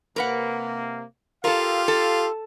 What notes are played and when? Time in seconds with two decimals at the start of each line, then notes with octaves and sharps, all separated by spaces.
0.16 C3 A#3 A#4 B4 F#5
1.44 F4 G4 A4 A#4 F5
1.88 A4